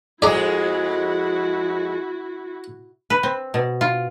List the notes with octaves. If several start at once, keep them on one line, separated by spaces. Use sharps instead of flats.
F2 G#3 E4 F#4 G#4 D5 A#5
B4
C4
B2
F4